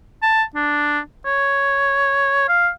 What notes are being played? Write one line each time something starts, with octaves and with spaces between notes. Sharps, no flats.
A5
D4
C#5
F5